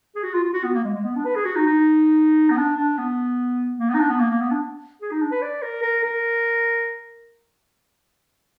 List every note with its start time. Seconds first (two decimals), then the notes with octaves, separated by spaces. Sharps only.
0.16 G#4
0.24 F#4
0.34 F4
0.44 F4
0.54 F#4
0.64 B3
0.75 A#3
0.84 G#3
0.95 G#3
1.04 B3
1.16 D4
1.25 B4
1.36 G#4
1.45 F#4
1.56 D#4
1.66 D#4
2.50 B3
2.57 D4
2.77 D4
2.98 B3
3.79 A#3
3.90 B3
3.94 D#4
4.00 D4
4.10 B3
4.20 A#3
4.31 A#3
4.41 B3
4.51 D4
5.02 G#4
5.11 D#4
5.22 D4
5.31 B4
5.42 D5
5.62 A#4
5.83 A#4
6.04 A#4